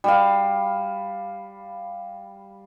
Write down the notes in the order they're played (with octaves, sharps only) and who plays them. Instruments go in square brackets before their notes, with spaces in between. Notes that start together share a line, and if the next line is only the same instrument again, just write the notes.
[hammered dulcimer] G3 F5